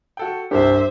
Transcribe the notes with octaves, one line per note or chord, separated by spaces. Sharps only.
F#4 A4 G5
C2 G2 D4 G4 C5 E5